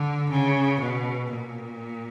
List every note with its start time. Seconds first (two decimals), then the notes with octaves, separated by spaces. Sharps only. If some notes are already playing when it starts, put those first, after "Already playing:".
Already playing: D3
0.29 C#3
0.80 B2
1.30 A#2